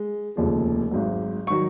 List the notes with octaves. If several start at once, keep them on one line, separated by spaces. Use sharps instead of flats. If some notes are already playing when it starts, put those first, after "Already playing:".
Already playing: G#3
F1 D#2 C#3 F3 G#3
G#1 G#2 F#3
D#3 F#3 C#6